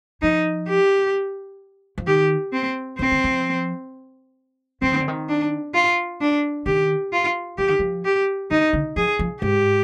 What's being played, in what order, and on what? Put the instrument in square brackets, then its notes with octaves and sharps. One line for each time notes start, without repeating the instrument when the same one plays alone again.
[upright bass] F3 [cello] D#4
[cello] G4
[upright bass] F3
[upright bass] D#3 [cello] G4
[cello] C4
[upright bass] F3 [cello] C4
[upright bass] D#3
F3
[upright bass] F3 [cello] C4
[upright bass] D#3
D3
D#3
[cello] D4
F4
D4
[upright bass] D#3 [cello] G4
[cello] F4
[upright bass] F3 [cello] G4
[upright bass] D#3
F3
[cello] G4
[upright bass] D#3 [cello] D#4
[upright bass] D3
[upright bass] F3 [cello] G#4
[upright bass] F3
[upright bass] G#2 [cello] G4